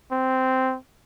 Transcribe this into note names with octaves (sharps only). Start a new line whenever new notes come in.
C4